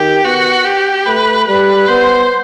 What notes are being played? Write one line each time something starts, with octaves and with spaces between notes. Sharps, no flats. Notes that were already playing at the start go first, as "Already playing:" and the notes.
Already playing: D#3 G4
B3 F#4
G4
A3 B4
G3 B4
B3 C5